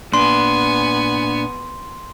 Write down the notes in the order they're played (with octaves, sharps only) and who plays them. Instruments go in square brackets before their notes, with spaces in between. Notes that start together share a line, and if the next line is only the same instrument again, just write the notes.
[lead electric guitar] A#2 D4 [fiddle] B3 G#5 [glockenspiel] C6